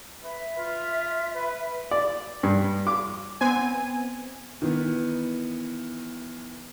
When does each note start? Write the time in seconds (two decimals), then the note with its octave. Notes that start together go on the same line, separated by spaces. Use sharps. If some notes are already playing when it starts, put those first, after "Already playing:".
0.23 B4 E5
0.58 F4
1.35 B4
1.91 D5
2.43 G2
2.87 D6
3.41 B3 C4 G#5
4.62 D#3 E3 B3